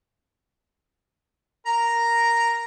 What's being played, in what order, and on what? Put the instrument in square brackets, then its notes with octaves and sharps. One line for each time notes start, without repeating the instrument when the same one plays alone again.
[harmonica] A#4 A#5